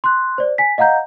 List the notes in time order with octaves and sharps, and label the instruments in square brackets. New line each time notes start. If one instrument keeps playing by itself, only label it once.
[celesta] C6 F#6
C5 D5
G#5 B6
D#5 F5 F#5 A#5 G6